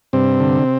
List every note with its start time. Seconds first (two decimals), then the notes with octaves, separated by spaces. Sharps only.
0.13 G2 C3 C4
0.40 D3